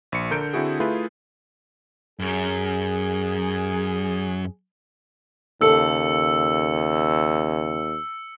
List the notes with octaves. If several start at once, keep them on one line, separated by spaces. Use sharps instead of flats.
A#1 C#7
D3 A#4 G6 C#7 D7
D3 C4 E4 F#4 G#4
A3 E4 F4 G#4 B4
F#2 G#4
D#2 C#3 A4 E6 C#7